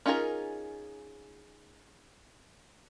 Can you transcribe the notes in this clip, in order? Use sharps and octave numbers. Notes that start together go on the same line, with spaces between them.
C#4 D#4 F4 G#4 A#4